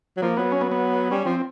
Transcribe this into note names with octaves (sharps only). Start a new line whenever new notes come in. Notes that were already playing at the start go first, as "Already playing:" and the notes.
F#3
F3 A#3
F#3 B3
C#4
B3
B3
G3 C#4
F3 C4